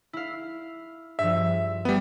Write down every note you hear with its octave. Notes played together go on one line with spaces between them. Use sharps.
E4 F5
G2 F3 E5
G3 B3